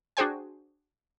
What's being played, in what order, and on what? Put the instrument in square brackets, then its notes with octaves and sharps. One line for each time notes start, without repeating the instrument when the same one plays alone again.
[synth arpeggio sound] D4 F#4 G#4 C5 G5 G#5